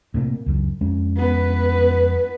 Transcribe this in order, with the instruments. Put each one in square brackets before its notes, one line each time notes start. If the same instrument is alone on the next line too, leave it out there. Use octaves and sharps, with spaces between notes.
[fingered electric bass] A2 C3 A#3
C#2 F#2
F2 G#3 C#4
[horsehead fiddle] B3 B4